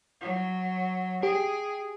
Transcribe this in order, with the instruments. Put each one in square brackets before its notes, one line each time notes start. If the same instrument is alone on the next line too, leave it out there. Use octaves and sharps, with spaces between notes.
[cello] F#3
[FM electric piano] G4 [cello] G#4